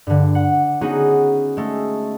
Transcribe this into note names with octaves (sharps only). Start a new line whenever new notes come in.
G2 D3
F#5
B3 C#4 D#4 F#4 G#4
G#3 A3